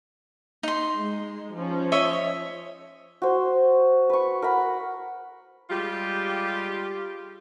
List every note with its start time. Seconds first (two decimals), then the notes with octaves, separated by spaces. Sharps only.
0.63 D#4 C6
0.96 G#3
1.57 F3 C#4
1.92 C#5 D#5 E5
3.22 F#4 C5
4.09 B4 C#6
4.42 A#4 F#5 B5
5.70 G3 G#3 F4 G4